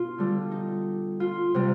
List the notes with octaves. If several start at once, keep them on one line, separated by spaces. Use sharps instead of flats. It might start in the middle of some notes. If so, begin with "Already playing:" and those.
Already playing: B2 F4
D3 G3
D#4
F4
C3 G3